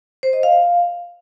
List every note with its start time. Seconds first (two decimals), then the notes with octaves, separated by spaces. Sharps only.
0.23 C5
0.33 D#5
0.43 F5